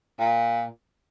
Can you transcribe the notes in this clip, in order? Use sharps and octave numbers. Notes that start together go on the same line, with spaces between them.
A#2